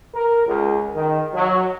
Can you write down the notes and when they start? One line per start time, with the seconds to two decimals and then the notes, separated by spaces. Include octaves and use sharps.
0.15 A#4
0.46 C#2
0.95 D#3
1.34 F#3